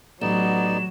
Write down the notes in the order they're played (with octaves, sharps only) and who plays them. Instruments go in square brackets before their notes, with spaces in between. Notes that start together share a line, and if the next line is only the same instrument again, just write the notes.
[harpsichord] A1 [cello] F#3 [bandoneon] B3 D#4 D5 [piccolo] E7